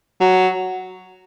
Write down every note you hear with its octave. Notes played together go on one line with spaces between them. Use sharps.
F#3